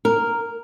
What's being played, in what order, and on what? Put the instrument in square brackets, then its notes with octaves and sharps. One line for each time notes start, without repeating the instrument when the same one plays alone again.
[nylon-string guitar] A#4